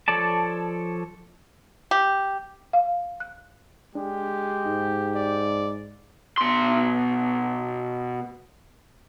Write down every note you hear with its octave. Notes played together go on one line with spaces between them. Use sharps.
F3 A4 C#5 D5 A5
G4
F5
F#6
G#3 D4 G4
G#2 D#4
D5
B2 C6